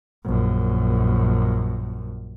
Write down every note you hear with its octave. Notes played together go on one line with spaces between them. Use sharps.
A#1 F#2